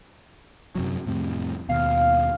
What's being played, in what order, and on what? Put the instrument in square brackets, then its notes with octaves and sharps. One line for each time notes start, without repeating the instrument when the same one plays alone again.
[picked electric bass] F#2 C3 F#3
F2 A2 C3
[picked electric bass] D#2 B2 [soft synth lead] F5